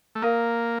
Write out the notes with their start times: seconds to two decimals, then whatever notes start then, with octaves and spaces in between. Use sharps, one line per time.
0.15 A3
0.22 A#3 A#4 F5 A#5